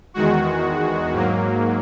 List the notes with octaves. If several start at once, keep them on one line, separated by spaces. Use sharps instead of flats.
E2 D#3 G#3 F#4
G#2 F#3 A#3